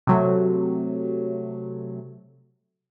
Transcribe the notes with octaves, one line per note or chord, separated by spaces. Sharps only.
C3 F#3 A3